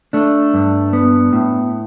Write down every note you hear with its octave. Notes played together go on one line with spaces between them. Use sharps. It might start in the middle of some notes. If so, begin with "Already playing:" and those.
A3 D4
G2
B3
A2